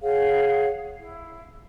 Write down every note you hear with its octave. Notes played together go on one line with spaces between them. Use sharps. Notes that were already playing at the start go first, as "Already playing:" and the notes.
G#4 C#5 F5 F#5
E4